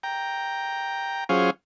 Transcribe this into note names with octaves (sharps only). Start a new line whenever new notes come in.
G5 A#5
F#3 C#4 F4 G#4 C5 F5